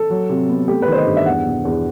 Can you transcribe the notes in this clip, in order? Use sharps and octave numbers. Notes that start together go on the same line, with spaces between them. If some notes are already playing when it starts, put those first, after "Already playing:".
Already playing: A4
F#3
C3
B3
A3 G4
B4
D#3 C5
D#5
G2
E5
E2 F#5
B2
E2